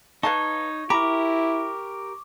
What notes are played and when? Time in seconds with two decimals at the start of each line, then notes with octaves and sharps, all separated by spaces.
0.23 D#4 B4 C#5 F5 A5 C#6
0.90 E4 G4 A#4 A#5 B5 D6